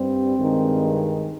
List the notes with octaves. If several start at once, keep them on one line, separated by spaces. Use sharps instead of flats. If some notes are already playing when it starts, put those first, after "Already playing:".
Already playing: G2 G3 C4
G2 D#3 G#3